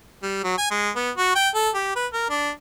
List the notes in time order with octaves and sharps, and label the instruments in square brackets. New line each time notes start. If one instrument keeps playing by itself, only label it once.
[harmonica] G3
F#3
G#5
G#3
B3
F#4
G5
A4
G4
B4
A#4
D4